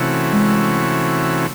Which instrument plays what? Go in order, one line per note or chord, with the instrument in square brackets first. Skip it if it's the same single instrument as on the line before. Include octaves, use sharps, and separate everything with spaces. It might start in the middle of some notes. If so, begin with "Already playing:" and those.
Already playing: [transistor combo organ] C3 E3 A3 C#4 F#4
[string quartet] G#3